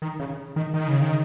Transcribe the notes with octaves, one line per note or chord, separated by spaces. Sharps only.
D#3
C#3
D#3
D#3
C#3
D#3